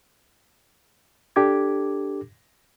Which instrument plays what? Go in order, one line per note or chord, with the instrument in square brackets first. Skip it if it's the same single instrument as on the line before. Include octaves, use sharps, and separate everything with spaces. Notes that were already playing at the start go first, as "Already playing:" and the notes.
[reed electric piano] D4 G4 A4 D6 G#6